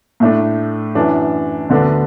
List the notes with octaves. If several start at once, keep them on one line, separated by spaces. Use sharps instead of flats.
A2 A3 D4
F#2 E3 D4
D2 D3 B3 D4